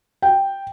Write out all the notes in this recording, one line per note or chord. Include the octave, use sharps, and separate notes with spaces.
G5